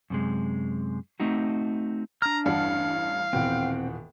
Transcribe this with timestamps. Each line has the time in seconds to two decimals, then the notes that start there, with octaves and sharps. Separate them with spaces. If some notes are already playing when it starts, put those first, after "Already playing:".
0.10 F#2 C3 G#3
1.20 A3 C4 D#4 F#4
2.22 D4 A#5 F6
2.46 A1 E2 G2 D5 F5 F#5 A5
3.33 D#1 B2 E3 C4 F#5 G5